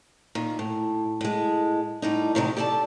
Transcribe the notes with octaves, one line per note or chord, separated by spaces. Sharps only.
A#2 D#3
A2
A2 G#3
A2 G3 D#4
A2 C3 D#3 E3 F#3 G#3
G4 A4 D5 G#5 A5